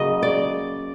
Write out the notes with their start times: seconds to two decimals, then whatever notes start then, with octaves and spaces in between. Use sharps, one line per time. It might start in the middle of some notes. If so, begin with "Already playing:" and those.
Already playing: C#3 F#3 A#3 D#5
0.23 D5